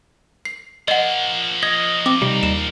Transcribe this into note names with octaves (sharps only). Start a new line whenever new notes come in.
C7
F3 A#3 D#5 F#5
D#5 G#6
C4 D6
C3 G3 D#4
D#2 E7